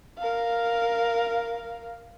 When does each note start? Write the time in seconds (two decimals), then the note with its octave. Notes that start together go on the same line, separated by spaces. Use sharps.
0.18 A#4 F5